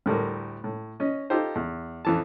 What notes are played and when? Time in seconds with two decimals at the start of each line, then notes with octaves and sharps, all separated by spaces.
0.06 D2 A2 G3 A#4
0.64 A2
1.00 C#4 D#5
1.30 D#4 F4 G4 A4 C5
1.55 E2
2.05 F2 E3 A5